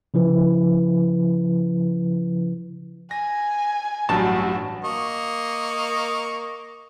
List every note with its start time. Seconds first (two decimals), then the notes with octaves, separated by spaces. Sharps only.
0.14 C#3 F3 E4 B4
3.11 G#5 A#6
4.09 A1 G2 F#3 F#4 A5
4.84 A#3 D#5 C#6